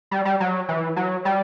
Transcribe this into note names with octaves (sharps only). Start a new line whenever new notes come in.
G3
G3
F#3
E3
F#3
G3